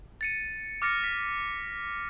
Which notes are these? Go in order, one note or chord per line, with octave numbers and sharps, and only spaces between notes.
A6 C#7 D#7
D6 F6 A6 A#6 C#7
B6